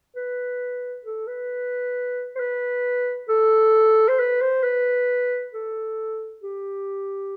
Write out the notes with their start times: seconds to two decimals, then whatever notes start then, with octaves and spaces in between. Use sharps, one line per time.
0.16 B4
1.05 A4
1.27 B4
2.36 C5
2.39 B4
3.29 A4
4.08 C5
4.19 B4
4.41 C5
4.63 B4
5.53 A4
6.42 G4